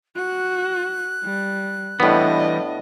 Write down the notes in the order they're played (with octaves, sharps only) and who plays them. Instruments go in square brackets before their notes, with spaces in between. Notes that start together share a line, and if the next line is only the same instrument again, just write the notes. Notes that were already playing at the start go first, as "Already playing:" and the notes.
[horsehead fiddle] F#4 [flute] F#6
[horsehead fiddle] G3
[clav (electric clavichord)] A2 B3 [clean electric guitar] E3 G3 [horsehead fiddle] D4 D#5